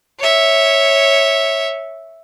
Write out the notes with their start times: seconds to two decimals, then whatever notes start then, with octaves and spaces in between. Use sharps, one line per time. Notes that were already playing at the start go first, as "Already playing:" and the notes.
0.19 C#5 E5